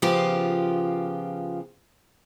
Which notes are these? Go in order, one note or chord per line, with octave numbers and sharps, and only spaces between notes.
C#3 F3 B3 F4 G4